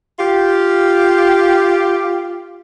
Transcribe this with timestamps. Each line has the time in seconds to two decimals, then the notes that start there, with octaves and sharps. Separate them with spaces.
0.19 F4 G4